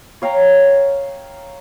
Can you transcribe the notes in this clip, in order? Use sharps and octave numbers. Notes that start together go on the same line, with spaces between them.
C#5 F5 G5 A#5